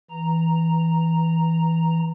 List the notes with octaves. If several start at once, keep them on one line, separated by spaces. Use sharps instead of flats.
E3 A#5